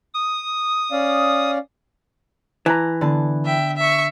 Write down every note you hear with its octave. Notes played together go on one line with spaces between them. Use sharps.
D#6
C#4 D5 F5
E3 A5 A#5
D3 B3 A5
E5 G5
E5 C#6